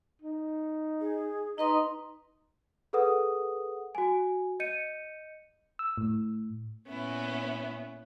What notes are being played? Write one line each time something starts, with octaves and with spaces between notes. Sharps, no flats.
D#4
G#4
D#4 B4 D#5 A#5 C6
G#4 A4 B4 F#5 D#6
F#4 G#5
D#5 G6 C#7 D#7
E6
A2
A#2 B3 C#4 E4